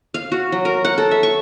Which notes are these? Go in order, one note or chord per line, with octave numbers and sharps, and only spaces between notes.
F5
F#4
F#3
A#4
F#5
A4
E5
C#6